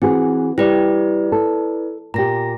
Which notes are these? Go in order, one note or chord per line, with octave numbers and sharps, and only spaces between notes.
E3 C4 F#4 G#4
G3 E4 G4 B4 D5
A4
A#2 G4 A#5 A#6